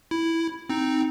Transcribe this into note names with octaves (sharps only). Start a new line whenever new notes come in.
E4
C4 D#4